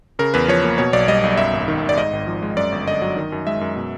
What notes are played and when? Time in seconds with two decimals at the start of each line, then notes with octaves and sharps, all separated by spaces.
0.19 C#3 A#4
0.34 E2 B4
0.48 F3 C#5
0.64 A#3
0.78 B2 C#5
0.93 B1 D5
1.08 G3 D#5
1.23 B1
1.38 F#2 E5
1.53 G#1
1.68 D#3
1.82 G#1
1.89 D5
1.97 G#2 D#5
2.13 G#1
2.27 F3
2.43 G#3
2.57 F#2 D5
2.72 G1
2.87 D3 D#5
3.02 F#3
3.16 D#3
3.32 F#2
3.47 G#3 E5
3.61 F#2
3.76 B2